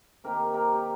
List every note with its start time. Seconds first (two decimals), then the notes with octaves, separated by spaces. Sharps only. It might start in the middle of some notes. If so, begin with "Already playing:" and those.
0.24 C3 D#3 A#3 G4 A#4
0.54 G4 A#4
0.72 G4